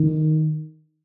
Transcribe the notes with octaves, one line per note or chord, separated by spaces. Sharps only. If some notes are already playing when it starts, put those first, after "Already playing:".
Already playing: D#3